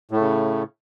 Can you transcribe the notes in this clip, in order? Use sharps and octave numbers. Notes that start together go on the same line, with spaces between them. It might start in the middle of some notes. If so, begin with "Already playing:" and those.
A2 C#3 A3